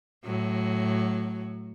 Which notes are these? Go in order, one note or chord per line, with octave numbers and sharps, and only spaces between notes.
A2 F#3